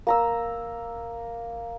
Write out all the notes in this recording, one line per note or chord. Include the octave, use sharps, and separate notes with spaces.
A#3 A#5 E6